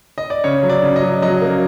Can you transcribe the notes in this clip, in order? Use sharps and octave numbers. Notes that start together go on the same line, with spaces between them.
D#5
D5
C#3 C#5
F#3
D5
C#3
D#5
F#3
F#3 D#5
A#3